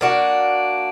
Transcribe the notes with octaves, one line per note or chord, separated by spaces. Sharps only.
A#3 D4 F#4